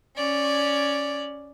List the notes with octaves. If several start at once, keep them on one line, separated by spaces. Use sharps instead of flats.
C#4 D5